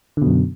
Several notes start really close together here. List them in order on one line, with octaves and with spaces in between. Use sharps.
D3 B2 F#2